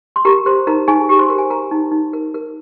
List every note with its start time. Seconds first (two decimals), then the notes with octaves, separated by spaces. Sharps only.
0.16 C6
0.25 G4 A#4 A#5
0.46 A#4 C5 C6
0.67 D#4 A#4 A#5
0.88 D#4 G#4 G#5
1.09 G4
1.19 C5 C6
1.29 A#4
1.38 G#5
1.50 A#4 A#5
1.71 D#4
1.92 D#4
2.13 A#4
2.34 A#4